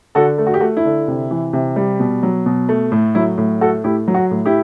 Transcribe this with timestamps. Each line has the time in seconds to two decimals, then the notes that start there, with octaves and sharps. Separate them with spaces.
0.15 D3 F#4 A4
0.38 A3
0.47 F#4
0.54 G4
0.60 A3 F#4
0.77 E4
0.85 D3
1.08 C3
1.31 E3
1.53 C3
1.76 G3
2.00 B2
2.23 F#3
2.46 B2
2.69 A3
2.92 A2
3.15 F#3 E4
3.38 A2
3.61 A3 F#4 A4
3.84 A2 E4 G4
4.08 F#3
4.14 F#4
4.31 A2
4.46 E4 G4